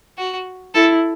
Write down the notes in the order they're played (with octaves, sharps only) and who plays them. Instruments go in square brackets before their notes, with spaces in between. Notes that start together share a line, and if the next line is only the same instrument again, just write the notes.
[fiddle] F#4
[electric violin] E4 [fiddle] A4